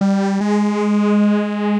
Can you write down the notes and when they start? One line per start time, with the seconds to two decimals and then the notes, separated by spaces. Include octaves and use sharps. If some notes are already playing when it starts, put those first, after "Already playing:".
0.01 G3
0.41 G#3